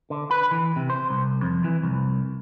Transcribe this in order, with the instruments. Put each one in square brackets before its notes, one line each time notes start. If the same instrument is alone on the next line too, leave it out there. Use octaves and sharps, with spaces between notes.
[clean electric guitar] D3
B4
E3
C3
C5
C2
F2
E3
C2